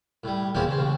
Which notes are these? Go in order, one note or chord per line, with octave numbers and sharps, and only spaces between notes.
A2 G3
A#1 E2 F3 C4 C#4 G4
C#3 C4
A1 C#3